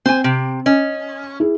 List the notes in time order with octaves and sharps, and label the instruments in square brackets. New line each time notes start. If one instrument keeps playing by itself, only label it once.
[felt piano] C4 [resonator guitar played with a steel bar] C5 G#5
[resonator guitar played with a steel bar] C3
[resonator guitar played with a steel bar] C#4 [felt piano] D#5
[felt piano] E4 G#4